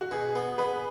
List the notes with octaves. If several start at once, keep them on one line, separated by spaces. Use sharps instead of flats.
F#4
B2 G#4
B3
B3 B4